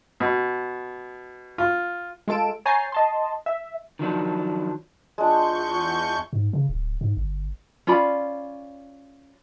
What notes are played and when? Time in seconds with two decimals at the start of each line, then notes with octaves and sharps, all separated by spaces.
0.20 B2
1.58 F4
2.28 G#3 F4 A4 D7 E7
2.65 C#5 G#5 A#5 G6 A6 C7
2.92 D#5 A5 C6
3.46 E5
3.99 D#3 F3 F#3 D4
5.18 E2 G#3 D4 F4 C#6 G6
6.33 G#2
6.53 C#3
6.69 D1
7.01 G#2
7.17 G1
7.87 C#4 F4 D5 B5